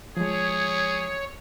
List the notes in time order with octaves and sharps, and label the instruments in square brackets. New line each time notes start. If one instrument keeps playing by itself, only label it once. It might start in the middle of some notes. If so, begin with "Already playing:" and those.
[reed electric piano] F3 G#3 [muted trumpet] G#4 [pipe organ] C#5